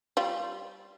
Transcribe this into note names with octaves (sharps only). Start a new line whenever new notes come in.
G3 F4